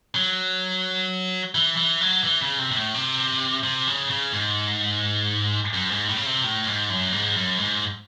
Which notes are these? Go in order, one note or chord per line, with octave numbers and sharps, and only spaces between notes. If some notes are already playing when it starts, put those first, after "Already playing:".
F#3
E3
E3
F#3
E3
C#3
C3
C3
A2
C3
C3
C#3
C#3
G#2
F#2
G#2
A2
C#3
C3
A2
G#2
F#2
G#2
F#2
G#2